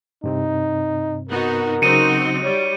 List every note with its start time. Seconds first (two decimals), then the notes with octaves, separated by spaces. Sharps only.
0.24 G2 C3 C4 D#4
1.29 B3 D#4 F#4 A#4
1.82 C#3 F#3 C4 D#4 F#4 C#7 D#7
2.43 G3 C#5